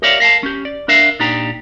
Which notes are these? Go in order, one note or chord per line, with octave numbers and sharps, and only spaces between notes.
G4 A#4 C#5 D5 E5 F5
A#4 F5 G#5 A5
C#4 G4
D5
D4 A#4 E5 F5
A#2 D4 D#4 G4 A#5